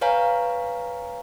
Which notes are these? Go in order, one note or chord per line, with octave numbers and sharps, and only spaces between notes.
B4 C#5 F5 G#5 A#5